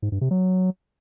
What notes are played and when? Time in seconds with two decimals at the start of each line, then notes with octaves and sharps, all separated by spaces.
0.02 G#2
0.12 G2
0.21 C3
0.31 F#3